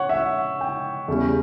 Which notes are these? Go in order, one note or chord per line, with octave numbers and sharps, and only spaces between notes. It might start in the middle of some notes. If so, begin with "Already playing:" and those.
Already playing: C#5 F#5
E5
F#5
G5
E2 C#3 E3 G3